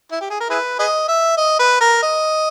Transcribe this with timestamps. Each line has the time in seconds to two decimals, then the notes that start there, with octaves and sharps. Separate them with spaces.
0.12 E4
0.21 G4
0.30 G#4
0.40 A#4
0.50 E4 G#4 B4
0.79 G#4 B4 D#5
1.08 E5
1.37 D#5
1.59 B4
1.80 A#4
2.03 D#5